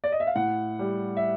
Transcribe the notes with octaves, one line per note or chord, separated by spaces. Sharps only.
D5
D#5
E5
F5
A2 F#5
G3
E5